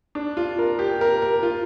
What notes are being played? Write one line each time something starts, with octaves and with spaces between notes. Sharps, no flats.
D4
F4
A#4
G4
A#4
A#4
F4